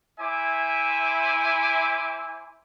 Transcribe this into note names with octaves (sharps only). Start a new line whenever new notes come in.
E4 C5 E5 G#5 D6